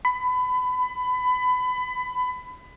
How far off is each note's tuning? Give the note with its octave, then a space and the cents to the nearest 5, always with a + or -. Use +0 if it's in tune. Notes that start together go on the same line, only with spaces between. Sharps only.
B5 +25